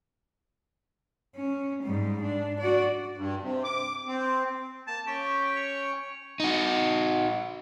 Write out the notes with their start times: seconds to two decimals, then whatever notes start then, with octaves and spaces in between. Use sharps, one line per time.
1.36 C#4
1.82 G#2 G3
2.22 D4
2.59 F#4 D5
3.17 G2
3.42 C3
3.64 D6
4.07 C4
4.87 A#3 A5
5.07 C#4 G4 G5 C#6
5.56 C#5
6.40 D#4 F#4